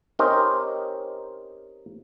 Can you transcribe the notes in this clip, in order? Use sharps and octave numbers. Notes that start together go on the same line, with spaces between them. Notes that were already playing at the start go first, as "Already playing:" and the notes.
C4 C#4 D#4 G4 A#4 C5